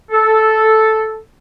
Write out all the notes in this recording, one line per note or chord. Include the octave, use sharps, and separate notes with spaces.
A4